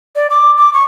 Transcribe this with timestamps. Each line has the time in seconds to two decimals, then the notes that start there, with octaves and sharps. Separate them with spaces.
0.16 D5
0.30 D6
0.57 D6
0.74 C#6